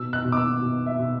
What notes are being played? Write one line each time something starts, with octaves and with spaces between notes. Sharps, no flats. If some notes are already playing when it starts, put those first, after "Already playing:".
Already playing: B2 E6
F#6
B2
D6
E6
B2
E5
B2